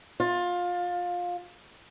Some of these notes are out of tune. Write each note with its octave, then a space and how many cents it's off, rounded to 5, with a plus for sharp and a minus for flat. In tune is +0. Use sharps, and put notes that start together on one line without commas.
F4 +20